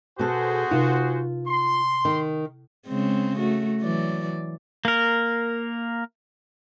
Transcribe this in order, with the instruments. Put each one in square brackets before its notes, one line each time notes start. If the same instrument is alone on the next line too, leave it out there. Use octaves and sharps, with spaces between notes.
[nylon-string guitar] B2 A4 [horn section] F#4 G#4 C5
[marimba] C3 D#4 [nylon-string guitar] F4
[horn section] C6
[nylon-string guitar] D#3
[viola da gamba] C#3 G#3 C4
A3 F#4
E3 F#3 D5
[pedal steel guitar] A#3 A#4